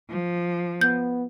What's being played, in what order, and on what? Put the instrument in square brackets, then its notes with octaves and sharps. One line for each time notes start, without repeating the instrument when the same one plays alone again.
[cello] F3
[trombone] B3 [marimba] G6